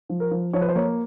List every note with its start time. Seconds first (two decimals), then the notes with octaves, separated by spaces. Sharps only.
0.09 F3
0.20 A#4
0.31 F3
0.53 F3 C#5
0.61 B4
0.69 C5
0.75 A#3 C#5